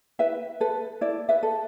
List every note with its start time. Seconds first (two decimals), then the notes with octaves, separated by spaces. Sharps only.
0.19 E4 B4 E5
0.60 A4 B4
1.01 E4 D5
1.29 B4 E5
1.43 A4